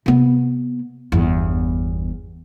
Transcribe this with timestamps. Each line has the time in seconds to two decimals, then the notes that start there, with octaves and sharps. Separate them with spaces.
0.06 C3 B3
1.12 G1 E2